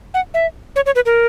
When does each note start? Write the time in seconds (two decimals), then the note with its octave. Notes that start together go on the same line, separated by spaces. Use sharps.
0.14 F#5
0.34 E5
0.76 C#5
0.86 C#5
0.95 B4
1.06 A#4